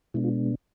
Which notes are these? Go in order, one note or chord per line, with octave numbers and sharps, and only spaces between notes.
B2 G#3 B3 D4 E4
F4